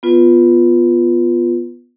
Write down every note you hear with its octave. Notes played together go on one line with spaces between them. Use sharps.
B3 F4 B4